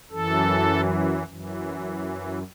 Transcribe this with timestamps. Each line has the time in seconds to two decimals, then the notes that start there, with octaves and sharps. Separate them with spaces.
0.11 F#2 E3 A4
1.27 F#2 E3